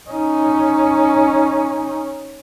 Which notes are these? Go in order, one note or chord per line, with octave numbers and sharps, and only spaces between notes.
C#4 D#4